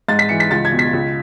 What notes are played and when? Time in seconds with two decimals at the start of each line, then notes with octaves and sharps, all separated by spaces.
0.08 G#2 A6
0.19 B6
0.29 E3 C#7
0.40 B6
0.50 C#2 A6
0.65 G#6
0.72 B2
0.79 B6
0.93 C#2